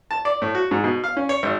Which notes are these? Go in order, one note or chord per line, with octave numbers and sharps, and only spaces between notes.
A5
D5
A2
F#4
G#2
B2
F5
C#4
C#5
G#1